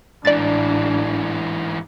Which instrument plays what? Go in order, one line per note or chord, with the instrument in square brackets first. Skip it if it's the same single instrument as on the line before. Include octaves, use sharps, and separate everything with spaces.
[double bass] A1 D4 [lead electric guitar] G#2 E3 [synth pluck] D5 A6